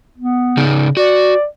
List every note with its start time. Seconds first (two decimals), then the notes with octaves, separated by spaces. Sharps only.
0.18 B3
0.57 C#3 D#4
0.97 F#4 D5